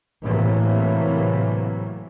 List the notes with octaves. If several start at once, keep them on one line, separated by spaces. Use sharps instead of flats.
A2 C3 E3 F#3 A3 A#3